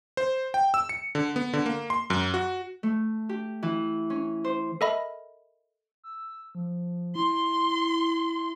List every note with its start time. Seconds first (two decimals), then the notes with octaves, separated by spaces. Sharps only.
0.17 C5
0.54 G5
0.74 E6
0.89 C#7
1.15 D3
1.36 B3
1.53 D3
1.66 A#3
1.90 C6
2.10 F#2
2.34 F#4
2.83 A3
3.29 G4
3.63 E3
4.10 C#4
4.44 C5
4.81 A4 A#4 D#5 E5 B5
6.04 E6
6.55 F3
7.15 E4 C6